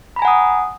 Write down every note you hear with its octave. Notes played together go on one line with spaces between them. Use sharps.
F#5 G#5 A#5 B5 D#6